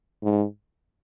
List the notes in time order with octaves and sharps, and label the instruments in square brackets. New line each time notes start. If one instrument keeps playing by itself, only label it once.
[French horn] G#2